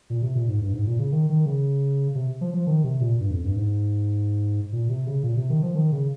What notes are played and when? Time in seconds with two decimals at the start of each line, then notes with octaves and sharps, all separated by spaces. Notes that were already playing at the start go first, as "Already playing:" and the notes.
0.10 A#2
0.22 C3
0.35 A#2
0.48 G#2
0.61 G2
0.74 G#2
0.87 A#2
0.99 C#3
1.12 D#3
1.30 D#3
1.46 C#3
2.15 C3
2.41 F3
2.54 F3
2.67 D#3
2.84 C3
3.01 A#2
3.20 G2
3.31 F2
3.43 G2
3.56 G#2
4.72 A#2
4.89 C3
5.07 C#3
5.23 A#2
5.36 C3
5.50 D#3
5.62 F3
5.75 D#3
5.92 C#3